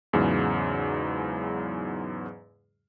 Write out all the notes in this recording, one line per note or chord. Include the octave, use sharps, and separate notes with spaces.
E2 G#2 C#3 F#3